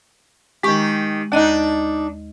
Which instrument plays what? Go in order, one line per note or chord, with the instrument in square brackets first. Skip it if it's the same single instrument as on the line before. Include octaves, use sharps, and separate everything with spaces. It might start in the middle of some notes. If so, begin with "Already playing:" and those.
[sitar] D#3 G4 [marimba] G#3 C#6
[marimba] D#2 D#5 F#6 [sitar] D4 D#4